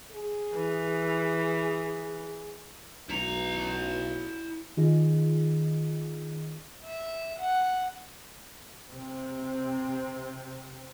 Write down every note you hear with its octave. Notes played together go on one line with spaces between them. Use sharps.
G#4
E3
B1 E4 A#5
D#3 D#4 F4 G#4 D#5
E5
F#5
C3 C4